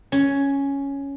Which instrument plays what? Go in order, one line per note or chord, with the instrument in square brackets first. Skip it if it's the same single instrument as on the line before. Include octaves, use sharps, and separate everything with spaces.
[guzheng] C#4